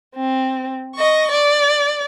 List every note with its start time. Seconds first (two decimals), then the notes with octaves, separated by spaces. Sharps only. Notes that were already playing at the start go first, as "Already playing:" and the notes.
0.16 C4
0.96 D#5 C#6
1.32 D5